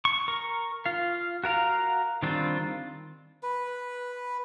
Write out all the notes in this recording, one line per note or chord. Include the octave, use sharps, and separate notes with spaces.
C#6
A#4 C#6
F4 F5
F#4 A#4 F5 A#5
D#3 G3 C4 D4 F4
B4